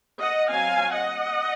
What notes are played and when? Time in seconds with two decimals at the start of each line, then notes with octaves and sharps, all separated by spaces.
0.20 D#5 F#5
0.49 F#3 C4 F5 G#5
0.93 D#5 F#5